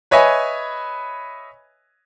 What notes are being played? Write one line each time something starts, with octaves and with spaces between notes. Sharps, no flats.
B4 C#5 D#5 E5 G#5